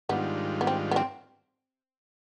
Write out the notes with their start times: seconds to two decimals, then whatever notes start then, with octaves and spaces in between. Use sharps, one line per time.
0.09 G#2 D#3 G3 B3 D4 F4
0.61 B3
0.67 C4
0.91 B3
0.96 C4